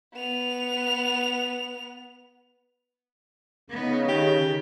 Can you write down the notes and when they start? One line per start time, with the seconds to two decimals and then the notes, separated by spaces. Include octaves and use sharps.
0.14 B3 F7
3.70 C#3 B3 D#4
4.08 D#3 G4